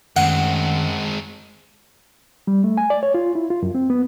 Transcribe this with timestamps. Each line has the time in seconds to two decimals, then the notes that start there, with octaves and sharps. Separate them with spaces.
0.16 F#2 D#3 G#3 A3 C4 F#5
2.47 G3
2.64 A3
2.77 G#5
2.90 D5
3.03 C#5
3.14 F4
3.35 E4
3.50 F4
3.63 F#2
3.75 C4
3.90 B3